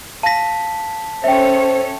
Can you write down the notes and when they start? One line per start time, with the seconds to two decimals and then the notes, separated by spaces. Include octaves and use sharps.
0.23 F5 A5 A#6 B6
1.24 C#4 A4 C5 C#5 E5 G5